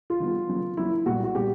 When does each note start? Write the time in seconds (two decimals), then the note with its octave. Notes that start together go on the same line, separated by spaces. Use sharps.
0.10 F4
0.20 D#3 G3 B3
0.49 C#3 F#3 A#3
0.77 C#3 F#3 A#3 E4
1.06 A#2 G3 B3 F#4
1.24 F#4
1.34 A#2 G3 B3 G4